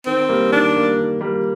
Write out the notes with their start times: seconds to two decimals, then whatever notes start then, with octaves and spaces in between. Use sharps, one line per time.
0.06 D#3 C4
0.29 G3 A#3
0.52 D#3 D4
0.74 G3 A#3
0.97 D#3
1.21 G3 A#3